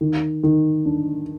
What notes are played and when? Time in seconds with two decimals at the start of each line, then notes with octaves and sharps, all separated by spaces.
0.01 D#3
0.43 D#3
0.85 D4